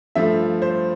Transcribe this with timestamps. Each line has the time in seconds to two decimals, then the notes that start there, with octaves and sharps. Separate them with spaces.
0.15 G2 F3 A3 E5
0.62 C5